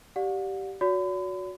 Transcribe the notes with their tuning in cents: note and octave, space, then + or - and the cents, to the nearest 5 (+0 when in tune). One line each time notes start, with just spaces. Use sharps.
G4 -15 D5 +0 F#5 -45
F#4 -15 C#5 +45 B5 +35